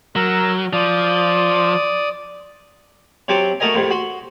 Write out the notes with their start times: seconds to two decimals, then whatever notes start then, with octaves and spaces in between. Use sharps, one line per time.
0.16 F#3 A#4 A#5 E6
0.73 F3 D5 D#6
3.28 C3 F#3 C4 A5 D6
3.60 A3 F#4 A4 A#4 D#5 G#5
3.74 F2 A2 C3
3.91 F#4 F#5 C6